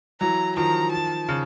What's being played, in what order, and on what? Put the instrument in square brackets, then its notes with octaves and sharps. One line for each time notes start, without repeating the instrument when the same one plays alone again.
[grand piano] E3 F#3 [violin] A#5
[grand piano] D#3 F3 [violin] A#5
[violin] A5
[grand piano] C#3